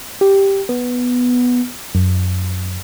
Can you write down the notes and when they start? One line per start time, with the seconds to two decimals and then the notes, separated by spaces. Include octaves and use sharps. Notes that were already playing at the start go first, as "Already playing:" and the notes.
0.21 G4
0.69 B3
1.95 F#2